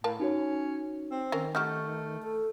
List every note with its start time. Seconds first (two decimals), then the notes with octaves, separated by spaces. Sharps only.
0.04 A2 A#4 F5 A5
0.20 C#4 D#4 F#4 C#5
1.12 C4
1.32 D#3 C#4 A#4
1.55 A3 D#4 F#4 G4 C#6 F6 G6
2.23 A4